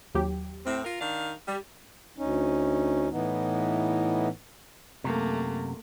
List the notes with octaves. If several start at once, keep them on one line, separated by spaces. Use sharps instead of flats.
D#2 F#3 G4
A2 C4
F4 A#4
D#3 D4 F5
G3
D2 C#4 D#4
A2 E3 B3 D#4
F#2 C3 A3 A#3